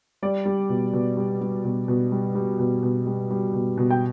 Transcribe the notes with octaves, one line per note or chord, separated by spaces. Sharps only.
G3 D5
G3
B2
B2
G3
G3
B2
B2
G3
G3
B2
B2
G3
G3
B2
B2
G5